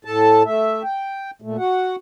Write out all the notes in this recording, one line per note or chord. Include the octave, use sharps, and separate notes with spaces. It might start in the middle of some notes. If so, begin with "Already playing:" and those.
A2 A4 A5
A3 E5
G5
A#2 A3
F#4 F#5